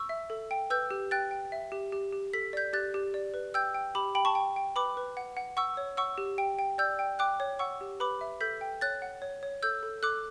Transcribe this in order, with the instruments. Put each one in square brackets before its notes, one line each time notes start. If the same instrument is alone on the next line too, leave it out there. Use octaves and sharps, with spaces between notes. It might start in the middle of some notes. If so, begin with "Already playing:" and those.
Already playing: [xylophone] C#6 E6
E5
A4
G5
B4 E6 G6
G4
G5 F#6 A6
G5
E5
G4
G4
G4
A4 B6
D5 G6 B6
G4 F#6 A6
G4
D5
B4
G5 E6 G6
G5
G4 B5 D6
G5 B5
A5 C#6
G5
G5
B4 B5 D6
B4
F#5
F#5
F#5 C#6 E6
C#5
F#5 C#6 E6
G4
G5
G5
D5 E6 G6
G5
G5 D6 F#6
C#5
F#5 C#6 E6
G4
B4 B5 D6
E5
A4 G6 B6
G5
C#5 F#6 A6
F#5
C#5
C#5
A4 E6 G6
A4
A4 D6 F#6